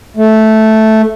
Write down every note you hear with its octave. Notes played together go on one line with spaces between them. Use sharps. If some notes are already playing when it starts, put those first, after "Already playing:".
A3